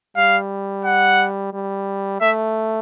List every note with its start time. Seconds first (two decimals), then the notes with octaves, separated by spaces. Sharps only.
0.17 G3 F5
0.85 F#5
1.53 G3
2.21 A3 E5